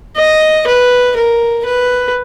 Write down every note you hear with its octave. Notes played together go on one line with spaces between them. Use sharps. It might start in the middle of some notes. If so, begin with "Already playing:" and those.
D#5
B4
A#4
B4